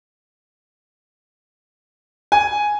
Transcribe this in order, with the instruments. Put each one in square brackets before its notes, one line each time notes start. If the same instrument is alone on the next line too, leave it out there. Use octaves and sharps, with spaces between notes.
[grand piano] G#5